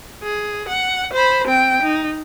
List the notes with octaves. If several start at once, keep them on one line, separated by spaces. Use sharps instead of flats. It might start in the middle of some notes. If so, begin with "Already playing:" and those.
G#4
F#5
C5 B5
C4 G5
D#4